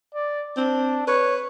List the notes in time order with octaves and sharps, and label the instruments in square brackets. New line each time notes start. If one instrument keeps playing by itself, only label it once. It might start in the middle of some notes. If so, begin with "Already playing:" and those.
[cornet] D5
[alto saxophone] C4 [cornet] D4
[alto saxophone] B4 [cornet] C#5